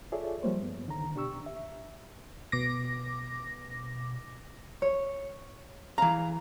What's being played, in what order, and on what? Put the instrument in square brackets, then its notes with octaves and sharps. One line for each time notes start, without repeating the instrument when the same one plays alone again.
[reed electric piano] F4 G#4 A4 C#5 D5 E5
F3 G3 A3 A#3 C5 C#5
G2 B3
C#2 D3 D#3 A#5
B2 D4 G4 C#6 E6
E5
[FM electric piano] B2 D6 A#6
[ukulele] C#5
[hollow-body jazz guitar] E3 A#5 [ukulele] G#4 F5